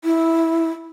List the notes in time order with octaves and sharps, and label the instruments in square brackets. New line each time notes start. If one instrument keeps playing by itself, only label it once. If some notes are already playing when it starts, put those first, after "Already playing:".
[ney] E4